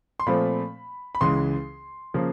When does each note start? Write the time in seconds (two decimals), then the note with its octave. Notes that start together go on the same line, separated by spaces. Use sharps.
0.20 C6
0.27 A#2 F3 A3 C4 B5
1.15 B5
1.21 C#2 C#3 E3 G#3 C6
2.14 C#3 F3 A#3